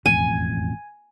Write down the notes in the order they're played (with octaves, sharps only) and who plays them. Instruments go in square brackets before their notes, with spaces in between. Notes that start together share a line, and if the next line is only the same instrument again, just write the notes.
[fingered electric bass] E1 A1 F2 [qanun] G#5